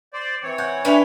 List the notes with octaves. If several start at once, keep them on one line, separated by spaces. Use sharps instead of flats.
C5 D5
E3 C4 C#5 C#7
F#5 G6
C#4 D4 B4 D5 E5 G5 F7